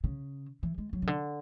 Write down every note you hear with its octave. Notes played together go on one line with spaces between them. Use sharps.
C#3
E3
G#3
F#3
C#3
D3